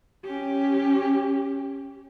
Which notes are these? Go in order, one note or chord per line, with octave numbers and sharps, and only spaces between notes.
C#4 G4